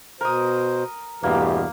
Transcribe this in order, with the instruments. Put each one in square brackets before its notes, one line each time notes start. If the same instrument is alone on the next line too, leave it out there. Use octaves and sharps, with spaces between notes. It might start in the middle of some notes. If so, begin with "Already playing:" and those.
[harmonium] B2 C5 [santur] A#4 D#6
[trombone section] E2 G2 B2 [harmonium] A3 G4 [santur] A#3